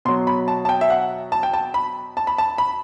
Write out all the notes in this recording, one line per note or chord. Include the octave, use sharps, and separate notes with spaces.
B2 F#3 C6
B5
A5
A5
G5
E5
F#5
A5
G5
A5
B5
A5
B5
A5
B5